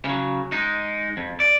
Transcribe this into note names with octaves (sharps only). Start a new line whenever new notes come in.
C#3 F#3
G#3 D#4
F2
D5